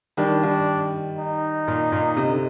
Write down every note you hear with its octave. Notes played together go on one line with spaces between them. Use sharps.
D#3 G3 D4
D#3 G3
D#4
A#2
A#2
C3
D3